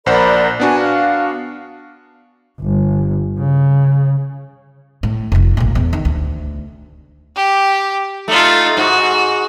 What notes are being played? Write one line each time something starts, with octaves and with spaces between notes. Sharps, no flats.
A#1 A#4 C5 D5 F#5 B5
B3 D4 F#4 G#5
F5
G1
C#3
A2
F1 F3
A1 A#2
E2
D#3
D2
G4
A3 D#4 F4
G#2 F#4